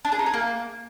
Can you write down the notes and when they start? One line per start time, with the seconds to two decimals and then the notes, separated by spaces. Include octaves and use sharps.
0.05 D4
0.12 G#4
0.19 D#4
0.26 G#4
0.34 A#3